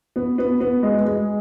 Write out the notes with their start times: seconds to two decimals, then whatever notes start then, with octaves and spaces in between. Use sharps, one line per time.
0.16 B3
0.38 B3
0.60 B3
0.83 G#3
1.05 G#3